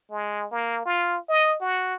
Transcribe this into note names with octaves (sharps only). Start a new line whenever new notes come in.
G#3
A#3
F4
D#5
F#4